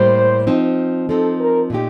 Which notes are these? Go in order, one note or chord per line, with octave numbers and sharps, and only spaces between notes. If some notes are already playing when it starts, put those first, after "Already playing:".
Already playing: A2 G3 A#3 C5
F3 C4 D#4
F3 C4 D#4 A4
A#4
A#2 A3 D#4 G4